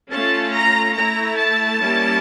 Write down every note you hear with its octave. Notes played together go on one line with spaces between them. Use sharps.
A3 C#4 F4 A5
A#5
A3 E4 A#5
A5
G3 A#3 C#4 E4